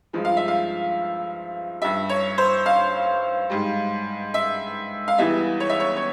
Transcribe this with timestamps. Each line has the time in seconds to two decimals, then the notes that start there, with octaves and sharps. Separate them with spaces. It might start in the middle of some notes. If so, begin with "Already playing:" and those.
0.13 G2 F3 G#3
0.25 F5
0.37 E5
0.48 F5
1.81 G2 G3 E5
2.09 C#5
2.38 C5
2.66 F5
3.50 G#2 G3
4.34 E5
5.08 F5
5.18 E2 E3 G3 E5
5.60 C#5
5.69 E5
5.80 C#5
5.97 C#5